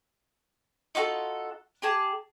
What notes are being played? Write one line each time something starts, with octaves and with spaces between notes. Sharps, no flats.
D#4 F4 F#4 A4
G4 G#4 A5